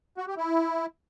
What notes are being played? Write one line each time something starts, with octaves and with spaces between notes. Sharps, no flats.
F#4
G4
E4